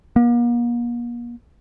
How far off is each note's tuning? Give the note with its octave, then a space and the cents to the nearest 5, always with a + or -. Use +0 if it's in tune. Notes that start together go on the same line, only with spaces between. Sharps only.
A#3 +40